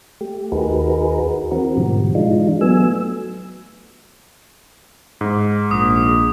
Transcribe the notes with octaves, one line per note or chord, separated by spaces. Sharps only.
A3 G4
D#2 D#4 F#4 G#4 A#4 B4
E3 C4 F#4 A#4
G#2 B2 D3 F3 G3
E3 G#3 D4 D#4 F4
F#3 A3 B3 G#5 E6
G#2
A#1 D#6